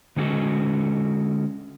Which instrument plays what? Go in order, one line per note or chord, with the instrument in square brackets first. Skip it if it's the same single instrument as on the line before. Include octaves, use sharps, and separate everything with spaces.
[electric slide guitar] D3 G#3 C#4 F#4 A4